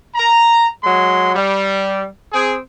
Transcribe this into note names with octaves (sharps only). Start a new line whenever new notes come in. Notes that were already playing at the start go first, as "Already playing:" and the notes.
A#5
F#3 G#3 C6
G3
C4 G#4